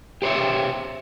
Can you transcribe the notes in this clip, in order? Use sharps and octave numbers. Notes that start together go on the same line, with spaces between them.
G4 C5 C#5 E5